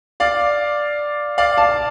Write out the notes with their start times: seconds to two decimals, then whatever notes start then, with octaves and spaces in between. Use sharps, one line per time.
0.20 D5 F5
1.38 D5 F5
1.58 F5 A5